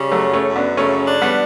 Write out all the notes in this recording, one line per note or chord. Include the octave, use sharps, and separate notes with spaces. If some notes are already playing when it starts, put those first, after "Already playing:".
Already playing: C#3 G3
F#3 A3
F#2
A3 C#4
F#2
B3 D4
C#3 A3 C#4
D4
G3 B3